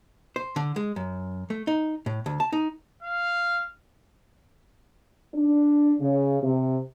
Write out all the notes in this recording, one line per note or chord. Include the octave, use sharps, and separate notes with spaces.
C5
D3
G#3
F#2
A3
D#4
A2
D2
A5
D#4
F5
D4
C#3
C3